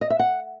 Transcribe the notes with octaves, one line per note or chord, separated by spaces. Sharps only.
D#5
E5
F#5